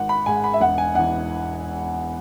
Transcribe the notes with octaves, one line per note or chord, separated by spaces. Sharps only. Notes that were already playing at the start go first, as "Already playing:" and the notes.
Already playing: G#1 F#5
B5
G#2 G#3 G#5
B5
E5
E1 F#5
G#5
E2 E3 F#5